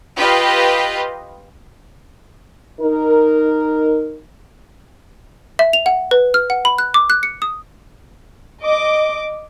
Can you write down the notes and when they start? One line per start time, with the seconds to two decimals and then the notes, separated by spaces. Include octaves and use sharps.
0.17 F4 G4 B4 D#5 F5
2.80 D#4 A#4
5.59 E5
5.73 F7
5.86 F#5
6.11 B4
6.34 F6
6.50 F#5
6.65 B5
6.78 F#6
6.94 D6
7.10 F#6
7.23 C#7
7.42 D#6
8.63 D#5 D6